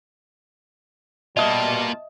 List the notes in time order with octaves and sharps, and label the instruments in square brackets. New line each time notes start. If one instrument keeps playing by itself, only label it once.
[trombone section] B2 G3 [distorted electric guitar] A#3 F4 [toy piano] D#5 E5 D#6 [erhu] A5